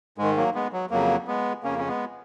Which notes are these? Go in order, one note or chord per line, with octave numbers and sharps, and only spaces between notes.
G#2 D#3 G#3
F#3 A#3
G#3 B3
F#3
F2 C#3 F#3 A#3
G#3 B3
F2 C#3 A#3 C#4
C#4
G#3 B3